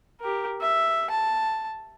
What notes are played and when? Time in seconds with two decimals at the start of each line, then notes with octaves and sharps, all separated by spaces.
0.21 G4 A#4
0.61 E5
1.10 A5